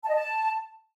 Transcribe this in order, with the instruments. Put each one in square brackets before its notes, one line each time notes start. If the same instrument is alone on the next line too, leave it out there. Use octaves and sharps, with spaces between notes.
[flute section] A5
D#5
A5